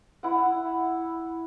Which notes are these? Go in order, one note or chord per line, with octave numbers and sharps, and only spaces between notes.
E4 F#5